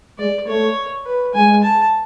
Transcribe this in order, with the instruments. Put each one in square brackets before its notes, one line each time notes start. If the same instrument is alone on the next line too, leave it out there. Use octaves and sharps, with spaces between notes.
[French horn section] G#3 [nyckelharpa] D5
[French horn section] A3 [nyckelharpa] C#5
[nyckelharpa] B4
[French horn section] G#3 [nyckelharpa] G#5
[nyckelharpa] A5